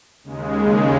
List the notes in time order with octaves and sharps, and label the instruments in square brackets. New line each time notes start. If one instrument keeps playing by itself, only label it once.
[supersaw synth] D#2 C#3 G#3